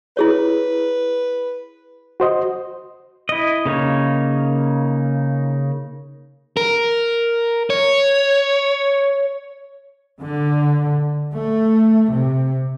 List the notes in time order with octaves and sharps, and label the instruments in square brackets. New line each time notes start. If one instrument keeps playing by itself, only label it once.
[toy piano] E4 G#4 C#5 [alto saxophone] B4
[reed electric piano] F#4 C5 D#5
[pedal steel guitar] E4 D#5
C#3 A#3 D#4 C#5
[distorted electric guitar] A#4
C#5
[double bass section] D3
A3
C3